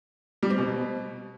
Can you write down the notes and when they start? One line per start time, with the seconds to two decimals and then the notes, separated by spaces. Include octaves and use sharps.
0.43 G3
0.50 C4
0.58 B2